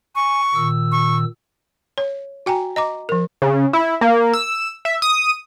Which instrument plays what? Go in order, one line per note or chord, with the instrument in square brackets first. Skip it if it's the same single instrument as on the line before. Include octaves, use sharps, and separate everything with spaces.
[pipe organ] G#5 [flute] C#6
[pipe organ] A#2 D#3 E6
[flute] C#6
[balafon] C#5
F#4 G5 G#5 A#5
D#5 A#5 D6
F3 A#4
[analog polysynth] C#3
E4
A#3
E6
E5
D#6